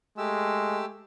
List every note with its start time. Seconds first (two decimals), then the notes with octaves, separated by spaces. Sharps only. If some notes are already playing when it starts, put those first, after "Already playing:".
0.18 G#3 A3 G4 E6